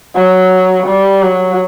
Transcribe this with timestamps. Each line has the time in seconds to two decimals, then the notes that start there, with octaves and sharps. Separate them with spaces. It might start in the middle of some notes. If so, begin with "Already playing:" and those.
0.15 F#3
0.86 G3
1.22 F#3